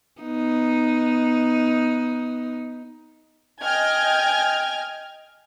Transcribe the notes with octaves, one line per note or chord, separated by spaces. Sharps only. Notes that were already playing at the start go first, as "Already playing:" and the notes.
B3 D#4
D#5 G5 G#5 F6 G#6